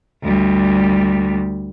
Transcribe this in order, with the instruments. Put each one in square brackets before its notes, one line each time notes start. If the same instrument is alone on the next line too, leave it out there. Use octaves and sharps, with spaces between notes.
[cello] D2 G3